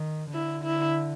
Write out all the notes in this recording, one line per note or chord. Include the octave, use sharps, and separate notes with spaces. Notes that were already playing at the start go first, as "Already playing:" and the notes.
Already playing: D#3
D3 E4
E4